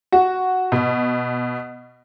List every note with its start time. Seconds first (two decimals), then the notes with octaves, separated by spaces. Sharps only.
0.12 F#4
0.72 B2